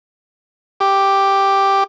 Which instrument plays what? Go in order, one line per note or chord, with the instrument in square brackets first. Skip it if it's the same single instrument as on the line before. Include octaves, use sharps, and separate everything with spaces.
[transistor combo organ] G4